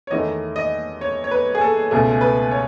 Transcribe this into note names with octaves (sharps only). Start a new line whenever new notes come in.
C#5
E2 D#3 A3 D#5
D#5
C#5
C#5
B4
G#4
A4
C#2 B2 A3 G#4
B4
C#5